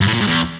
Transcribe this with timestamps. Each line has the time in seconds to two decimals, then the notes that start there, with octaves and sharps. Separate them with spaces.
0.01 G2
0.08 A2
0.14 A#2
0.21 G#2
0.27 E2